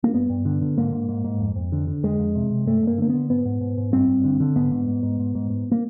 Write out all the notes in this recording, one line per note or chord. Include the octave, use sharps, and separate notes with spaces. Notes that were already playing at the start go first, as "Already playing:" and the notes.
A#3
G2 B3
G2
D3
D3
G#2 A#3
G#2
G#2
G#2
F2
F2
D3
D3
F2 G#3
F2
C3
C3
G2 A3
G2 A#3
D3 A#3
D3 B3
G#2 B3
G#2
G#2
G#2
G2 C4
G2
D3
D3
G#2 B3
G#2
G#2
G#2
G#2
G#2
G#2
A#3